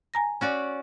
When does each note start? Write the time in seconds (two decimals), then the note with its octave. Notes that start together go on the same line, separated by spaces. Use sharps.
0.14 G#5 A#5 A#6
0.41 C#4 F#4 D5